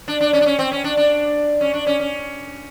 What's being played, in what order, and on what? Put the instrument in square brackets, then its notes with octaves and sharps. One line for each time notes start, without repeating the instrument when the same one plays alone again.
[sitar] D4
D4
C#4
D4
C#4
C4
C#4
D4
D4
C#4
D4
C#4
C#4